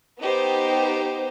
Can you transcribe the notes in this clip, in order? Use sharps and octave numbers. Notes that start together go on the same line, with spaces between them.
B3 D#4 G4 C5